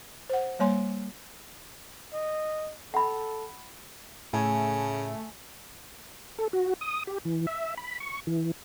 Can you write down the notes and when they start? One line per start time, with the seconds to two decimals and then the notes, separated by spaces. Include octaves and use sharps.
0.29 C5 F#5
0.59 G3 A#3 C#5 G#5 C6
2.13 D#5
2.94 A4 F#5 B5
4.33 A2 C#3 A3 G#5
6.38 A4
6.53 F#4
6.81 D#6
7.07 G4
7.25 E3
7.47 E5
7.77 B5
8.00 C#6
8.27 E3